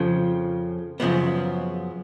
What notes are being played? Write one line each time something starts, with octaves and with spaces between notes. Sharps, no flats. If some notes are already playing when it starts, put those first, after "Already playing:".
Already playing: F2 C#3 F3
F#2 C#3 F3 B3